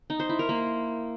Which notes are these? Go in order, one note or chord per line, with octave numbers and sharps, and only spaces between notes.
D#4
C5
E4
A#4
A#3